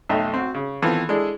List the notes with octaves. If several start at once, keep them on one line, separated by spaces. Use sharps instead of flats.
B1 F2 A3 D#4 E5 G5
C4 F#4
C#3
D#3 E3 B3 C4 F4 A4
G#3 D4 E4 G#4 A4